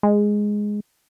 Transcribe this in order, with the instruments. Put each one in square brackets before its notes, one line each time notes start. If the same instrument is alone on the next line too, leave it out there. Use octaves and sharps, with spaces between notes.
[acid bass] G#3